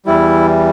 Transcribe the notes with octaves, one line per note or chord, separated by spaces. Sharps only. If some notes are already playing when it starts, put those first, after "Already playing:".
E2 E3 G3 E4